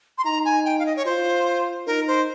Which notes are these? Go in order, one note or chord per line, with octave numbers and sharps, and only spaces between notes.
C6
D#4 A#5
G#5
G5
F5
D#5
C#5
F4 C5
D#4 A#4
C5